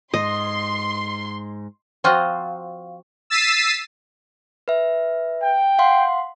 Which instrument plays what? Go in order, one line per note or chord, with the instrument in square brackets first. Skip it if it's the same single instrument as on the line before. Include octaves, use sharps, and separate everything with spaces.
[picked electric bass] G#2 [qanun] D#5 [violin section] C6
[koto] F3 C4 F4 F#4 D#5
[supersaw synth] E6 A6 B6 C7 D#7 E7
[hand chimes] B4 E5
[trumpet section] G5
[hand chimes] F5 F#5 C6